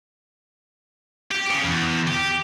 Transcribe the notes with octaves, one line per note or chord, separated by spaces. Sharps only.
G4
C#3
E2
G4